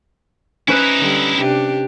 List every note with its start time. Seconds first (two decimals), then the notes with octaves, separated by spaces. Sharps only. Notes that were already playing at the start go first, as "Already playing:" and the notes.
0.68 C#4 D#4 E4 B4
1.00 D3 G3
1.37 C3 D4 G4